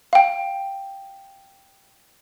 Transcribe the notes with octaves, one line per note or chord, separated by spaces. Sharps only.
F5 G5